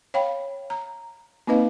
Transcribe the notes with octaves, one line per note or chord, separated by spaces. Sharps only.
C#5 F5 G5 B5
A#5
A#3 C4 D#4 B4 D#5 F5